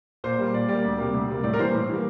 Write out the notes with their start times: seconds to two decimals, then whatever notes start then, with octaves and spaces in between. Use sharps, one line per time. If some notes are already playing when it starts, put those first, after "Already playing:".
0.24 A#2 C5
0.38 G3 A#3
0.54 A#2 D5
0.68 G3 A#3 D5
0.84 D2
0.98 C3 G3 A#3
1.14 D2
1.28 C3 G3 A#3
1.44 A2 D5
1.54 A#4
1.59 E3 G3 A#3 C5
1.74 A2
1.89 E3 G3 A#3